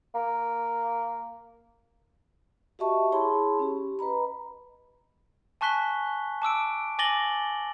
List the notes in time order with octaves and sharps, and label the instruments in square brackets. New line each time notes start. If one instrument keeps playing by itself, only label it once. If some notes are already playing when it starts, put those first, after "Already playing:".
[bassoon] A#3
[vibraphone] F#4 G4 D#5 E5 A5 C#6
E4 G#4 C#5 A5 B5 C6
C#4 G4
B4 D#5 A#5 B5
[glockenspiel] G#5 A5 C#6 F#6 B6 G7
A5 D6 E6 D7
G#5 D6 A6 A#6 F#7 G7